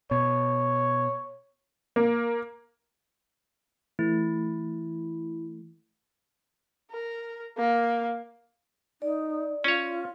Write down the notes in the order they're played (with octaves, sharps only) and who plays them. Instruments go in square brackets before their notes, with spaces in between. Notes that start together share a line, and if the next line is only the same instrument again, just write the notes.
[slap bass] B2 [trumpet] C#5
[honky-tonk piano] A#3
[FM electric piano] E3 A3 [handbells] E4
[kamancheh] A#4
A#3
[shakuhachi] D#4 [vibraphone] D5
[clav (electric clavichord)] C#4 C#5 [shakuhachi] F4